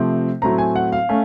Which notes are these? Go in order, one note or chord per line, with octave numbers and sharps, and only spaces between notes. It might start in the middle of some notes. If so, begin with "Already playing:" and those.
Already playing: C3 F3 A3 C4
A2 F#3 A3 C4 A#5
G#5
F#5
F5
A3 C#4